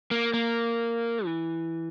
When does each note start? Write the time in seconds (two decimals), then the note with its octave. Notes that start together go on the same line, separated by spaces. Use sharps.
0.11 A#3
0.34 A#3
1.25 E3